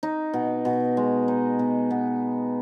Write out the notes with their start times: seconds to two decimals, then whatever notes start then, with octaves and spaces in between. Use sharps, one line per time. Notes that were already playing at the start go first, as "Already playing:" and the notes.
0.03 D#4
0.33 B2
0.65 B2
0.97 G#3
1.28 D#4
1.59 B2
1.91 B3